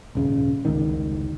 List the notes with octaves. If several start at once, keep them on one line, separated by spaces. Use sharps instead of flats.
D#1 G#1 C#3
F1 C#2 D#3